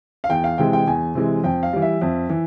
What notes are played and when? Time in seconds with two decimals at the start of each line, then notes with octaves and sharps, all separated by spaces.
0.24 F5
0.29 E2 G5
0.44 F5
0.58 C3 E3 G#3 G5
0.73 G5
0.87 E2 G#5
1.15 C3 E3 G#3
1.44 F2 G5
1.63 F5
1.73 E3 G3
1.82 E5
2.02 F2
2.30 E3